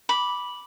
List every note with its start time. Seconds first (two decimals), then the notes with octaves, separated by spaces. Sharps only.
0.09 B5 D6